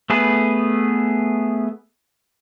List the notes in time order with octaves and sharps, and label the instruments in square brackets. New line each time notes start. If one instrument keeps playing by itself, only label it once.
[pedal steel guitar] A3 B3 G#4 B4